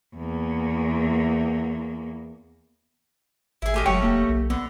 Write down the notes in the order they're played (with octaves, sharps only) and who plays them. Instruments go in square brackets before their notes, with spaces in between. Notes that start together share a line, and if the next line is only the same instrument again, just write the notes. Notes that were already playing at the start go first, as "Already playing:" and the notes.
[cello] E2 A#3
[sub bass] G#1 [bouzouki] E4 G#4
[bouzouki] D#3 G4 G#5 [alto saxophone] A3
[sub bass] F#1 [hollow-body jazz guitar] F#3 G#3 G5 [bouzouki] C#4 F#4 A4
[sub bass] E1 [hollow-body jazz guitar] A#3 G4
[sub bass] B1
[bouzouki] D3 [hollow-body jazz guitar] B3